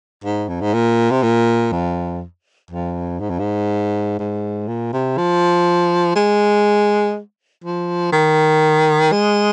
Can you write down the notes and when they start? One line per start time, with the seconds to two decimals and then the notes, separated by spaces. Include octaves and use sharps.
0.24 G#2
0.48 F2
0.61 G#2
0.74 A#2
1.11 C3
1.23 A#2
1.72 F2
2.71 F2
3.20 G#2
3.30 F2
3.39 G#2
4.19 G#2
4.68 A#2
4.93 C3
5.18 F3
6.16 G#3
7.64 F3
8.12 D#3
9.12 G#3